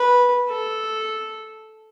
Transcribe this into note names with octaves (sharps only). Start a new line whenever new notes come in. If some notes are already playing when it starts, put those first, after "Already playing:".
Already playing: B4
A4